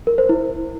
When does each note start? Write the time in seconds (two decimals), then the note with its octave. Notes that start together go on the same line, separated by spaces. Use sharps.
0.07 A#4
0.18 C5
0.29 E4